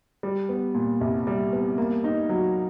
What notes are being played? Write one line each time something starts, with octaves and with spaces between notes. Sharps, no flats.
G3
B3
A#2
C2
G3
B3
A#3
D#4
F#3